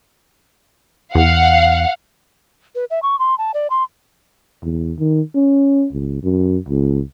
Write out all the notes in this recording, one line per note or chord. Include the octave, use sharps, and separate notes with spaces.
E2 F5 F#5
B4
E5
C#6
C6
A5
D5
C6
E2
D#3
C#4
C#2
F#2
C#2